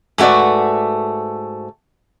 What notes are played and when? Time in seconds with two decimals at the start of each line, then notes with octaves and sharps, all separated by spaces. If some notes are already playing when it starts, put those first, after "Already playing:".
0.18 G#2 A3 F#4 B4 D5